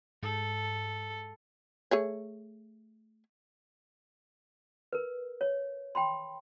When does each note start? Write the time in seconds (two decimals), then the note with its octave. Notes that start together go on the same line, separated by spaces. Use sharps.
0.23 G#2 A4
1.91 A3 G#4 C#5
4.93 A#4 B4
5.41 C#5
5.95 G5 B5 C6